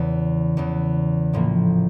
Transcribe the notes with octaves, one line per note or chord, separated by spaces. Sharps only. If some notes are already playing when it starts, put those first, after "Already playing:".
Already playing: E2 C#3 E3
E2 C#3 E3
A#1 A2 F3 A#3